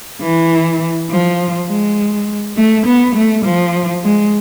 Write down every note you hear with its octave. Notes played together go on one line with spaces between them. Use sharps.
E3
F3
G#3
A3
B3
A3
F3
G#3